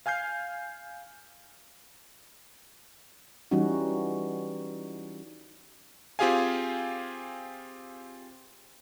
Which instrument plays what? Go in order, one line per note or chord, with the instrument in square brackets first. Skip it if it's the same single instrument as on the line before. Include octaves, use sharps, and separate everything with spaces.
[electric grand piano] F5 G#5 F6 G6 C7
[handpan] E3 G3 C#4 D#4 F#4
[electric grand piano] C4 F4 G4 G#4 F5 G#5